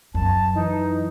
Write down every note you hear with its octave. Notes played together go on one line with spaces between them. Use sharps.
F#2 A5
E3 D#4